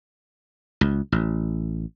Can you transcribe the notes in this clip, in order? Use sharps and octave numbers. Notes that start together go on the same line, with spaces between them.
C#2
A1